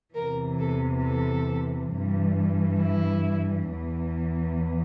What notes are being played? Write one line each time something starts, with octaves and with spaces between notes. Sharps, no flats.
E2 C3 E3 A#4
A4
A4
G2 E3
E4
E2 E3